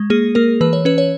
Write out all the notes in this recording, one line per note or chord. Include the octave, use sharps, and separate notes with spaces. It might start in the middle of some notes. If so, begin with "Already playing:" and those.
Already playing: G#3
A#3 G#4
A#3 A#4
E3 B4
C#5
C#4 B4
C#5